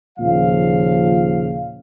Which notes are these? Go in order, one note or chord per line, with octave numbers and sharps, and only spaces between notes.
D#2 A#2 C#3 F3 F5